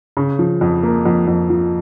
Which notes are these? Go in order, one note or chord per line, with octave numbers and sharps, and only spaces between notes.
C#3
F3
F2
A#3
F2
F2
F3